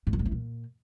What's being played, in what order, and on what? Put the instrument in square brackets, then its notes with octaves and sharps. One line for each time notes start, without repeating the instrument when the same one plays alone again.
[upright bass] G#2
F2
A2
E3
A#2